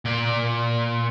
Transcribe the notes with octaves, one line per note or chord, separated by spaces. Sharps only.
A#2 D5